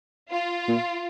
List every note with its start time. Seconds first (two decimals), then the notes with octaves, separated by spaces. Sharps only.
0.29 F4
0.68 A#2